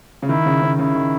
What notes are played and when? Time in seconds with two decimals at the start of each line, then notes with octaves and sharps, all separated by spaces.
0.22 C#3
0.29 D#3 E4
0.46 C#3
0.62 C#3
0.79 C#3 E4
0.95 D#3